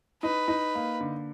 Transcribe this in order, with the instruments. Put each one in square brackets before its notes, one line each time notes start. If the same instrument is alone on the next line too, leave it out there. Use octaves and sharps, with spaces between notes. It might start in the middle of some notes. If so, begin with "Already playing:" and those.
[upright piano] D#4 [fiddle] B4
[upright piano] D#4
A#3
D3